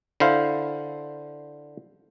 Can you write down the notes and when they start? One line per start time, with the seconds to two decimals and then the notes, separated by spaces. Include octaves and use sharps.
0.20 D3 E4 C5 F5